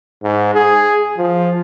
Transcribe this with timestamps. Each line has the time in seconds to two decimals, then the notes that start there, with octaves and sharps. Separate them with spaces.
0.23 G#2
0.55 G#4
1.17 F3